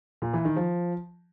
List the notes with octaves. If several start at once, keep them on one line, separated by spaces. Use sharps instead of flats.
A#2
E3
D#3
F3